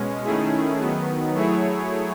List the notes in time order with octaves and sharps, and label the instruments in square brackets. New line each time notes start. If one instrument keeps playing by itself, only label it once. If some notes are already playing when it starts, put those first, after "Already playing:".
Already playing: [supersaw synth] B2 G#3 C#4
D#3 A3 C#4 E4 G#4
D#3 F#3 B3
F#3 A3 E4 G#4 C#5